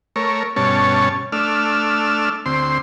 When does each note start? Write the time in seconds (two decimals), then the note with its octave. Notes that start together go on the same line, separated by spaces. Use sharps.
0.16 A3 A#4 C#5
0.56 G2 B2 C#4 C#5 A5
1.32 A3 D4 E6 F6
2.46 D2 C4 C6